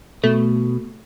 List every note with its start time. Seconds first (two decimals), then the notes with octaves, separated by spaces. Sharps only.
0.24 B2 A3